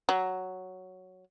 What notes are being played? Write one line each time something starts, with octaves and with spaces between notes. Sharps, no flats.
F#3